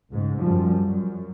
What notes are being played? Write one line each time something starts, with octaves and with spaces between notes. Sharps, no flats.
C#2 G#2
F#2 F3 G3
F#2